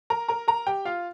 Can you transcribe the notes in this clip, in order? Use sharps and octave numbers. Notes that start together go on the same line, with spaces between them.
A#4 A#5
A#4 A#5
A#4 A#5
G4 G5
F4 F5